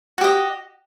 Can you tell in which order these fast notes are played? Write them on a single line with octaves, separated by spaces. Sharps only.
F#4 G4 D#5